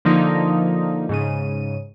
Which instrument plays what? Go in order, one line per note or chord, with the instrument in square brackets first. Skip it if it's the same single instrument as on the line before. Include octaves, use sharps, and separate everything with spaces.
[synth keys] D3 F3 A#3 D#4
G#2 C#3 D#7